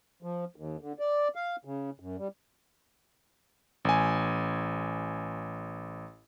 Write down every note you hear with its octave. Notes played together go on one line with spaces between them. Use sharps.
F3
D#2
D3
D5
F5
C#3
F#2
G3
A1 G#5